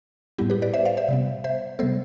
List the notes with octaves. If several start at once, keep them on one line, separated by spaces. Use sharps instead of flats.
A2 G3 B3 E4 G4
G4 B4
B4 D5
C5 E5
D5 F5
C5 E5
C3 G3 B3
C5 E5
C3 G3 B3 A4 C5